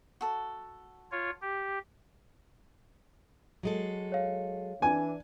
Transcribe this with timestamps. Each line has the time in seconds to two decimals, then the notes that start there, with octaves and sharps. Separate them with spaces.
0.21 F#4 A4
1.12 F4 C#5
1.42 G4
3.63 F#3 G#3 A4
4.12 C#5 F5
4.82 E3 D4 G#5